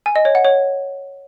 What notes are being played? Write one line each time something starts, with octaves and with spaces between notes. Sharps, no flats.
G#5
D#5
C#5
F#5
C#5